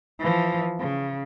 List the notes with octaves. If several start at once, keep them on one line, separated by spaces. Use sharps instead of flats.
E3 F3
C#3